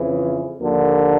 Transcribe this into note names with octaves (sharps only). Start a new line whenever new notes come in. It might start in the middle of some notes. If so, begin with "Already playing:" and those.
Already playing: F2 C#3 E3
D#2 D3 F3 A#3